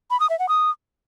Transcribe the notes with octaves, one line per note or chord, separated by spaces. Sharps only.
B5
D#6
E5
F#5
D#6